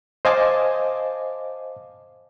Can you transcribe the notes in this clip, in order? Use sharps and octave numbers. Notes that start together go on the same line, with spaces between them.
C5 D#5 F5 G#5 A5 D6